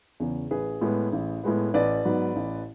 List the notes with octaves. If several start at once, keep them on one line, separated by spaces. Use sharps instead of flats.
E2 C#3
A1 G#4 B4
A2 G#3 B3
A1
A2 G#3 B3
A1 B4 D5
G#2 F#3 B3
A1